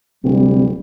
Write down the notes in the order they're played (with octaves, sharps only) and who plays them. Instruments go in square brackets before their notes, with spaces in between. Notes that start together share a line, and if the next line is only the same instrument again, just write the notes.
[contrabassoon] D1 [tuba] C3 [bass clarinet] G3